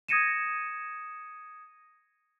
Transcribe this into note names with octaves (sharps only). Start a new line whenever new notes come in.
D#6 G#6 A#6 C#7 D#7 E7